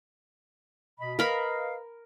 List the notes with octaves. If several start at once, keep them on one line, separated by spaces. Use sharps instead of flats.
B2 D#5 B5
A#4 B4 D#5 F5 B5